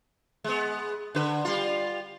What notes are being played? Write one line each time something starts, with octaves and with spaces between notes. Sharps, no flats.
G#3 B3
D3 B4
G3 F4